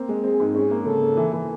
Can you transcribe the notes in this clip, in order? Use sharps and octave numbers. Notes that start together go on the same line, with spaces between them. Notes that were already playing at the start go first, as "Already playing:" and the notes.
Already playing: A#3 C4
G#3
C4 G#4
G#2
C#4 G#4
A#3
C#3 A4
A#3
E3
E3